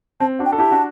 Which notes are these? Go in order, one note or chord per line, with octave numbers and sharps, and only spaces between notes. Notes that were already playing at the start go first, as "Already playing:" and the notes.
C4 A5
D4 F#4
G5
A4
E4 G4 A5
D4 F#4